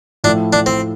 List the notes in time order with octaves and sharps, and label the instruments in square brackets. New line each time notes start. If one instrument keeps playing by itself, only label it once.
[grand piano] A2 F3 A3 E4 A4 [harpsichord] D4
[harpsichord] D4
C4